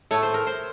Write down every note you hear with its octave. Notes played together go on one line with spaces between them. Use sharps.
A2 A3 C#5
C5
A#4
C5